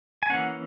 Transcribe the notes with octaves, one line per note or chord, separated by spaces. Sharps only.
G#5
E3 A#3 C#4 F#5